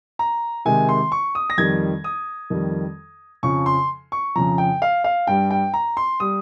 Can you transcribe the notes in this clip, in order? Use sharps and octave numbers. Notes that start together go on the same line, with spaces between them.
A#5
C3 D#3 G#3 G#5
C6
C#6
D#6
A#6
F2 D#3 G3 G#6
D#6
F2 D#3 G3
F2 C#3 F3 C#6
C6
C#6
F2 C#3 F3 A#5
G5
F5
F5
G2 G3 G5
G5
A#5
C6
G3 D#6